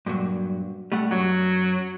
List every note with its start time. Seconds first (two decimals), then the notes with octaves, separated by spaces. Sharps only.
0.06 G2 A#2 F#3
0.92 G3 A3 F#5
1.11 F#2 F#3 F#4